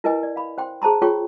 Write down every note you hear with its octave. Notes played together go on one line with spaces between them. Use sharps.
E4 A#4 B4 D#5 G#5
D5
F5 B5
C5 G5 C6
G#4 C5 A5 A#5 C6
F4 G#4 C#5 G5 C6 C#6